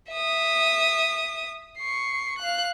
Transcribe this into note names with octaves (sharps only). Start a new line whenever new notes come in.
E5 D#6
C#6 C7
F5 F#6